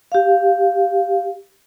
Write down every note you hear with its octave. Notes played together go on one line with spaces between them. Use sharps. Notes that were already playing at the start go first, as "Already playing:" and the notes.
G4 F5